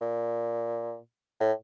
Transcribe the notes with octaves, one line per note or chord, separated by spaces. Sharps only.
A#2
A2